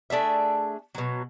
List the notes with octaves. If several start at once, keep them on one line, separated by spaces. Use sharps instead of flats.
A3 D4 G#4 E5
B2 F#3